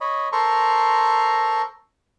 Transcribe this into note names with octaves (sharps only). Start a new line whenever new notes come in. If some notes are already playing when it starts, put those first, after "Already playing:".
C#5 D#5 B5
A4 A#4 C5 A#5 C6 C#6